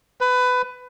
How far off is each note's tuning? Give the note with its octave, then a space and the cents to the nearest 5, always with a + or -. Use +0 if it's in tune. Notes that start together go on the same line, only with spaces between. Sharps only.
B4 +20